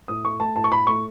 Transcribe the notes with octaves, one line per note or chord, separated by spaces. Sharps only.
A2 D#6
A3 C#6
A3 A5
A2 A5
C#6
A2 B5
A3 C#6